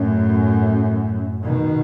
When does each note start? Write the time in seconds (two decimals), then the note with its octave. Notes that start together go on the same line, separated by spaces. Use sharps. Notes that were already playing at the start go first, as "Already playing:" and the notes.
Already playing: F#2 A2
1.42 B2 D#3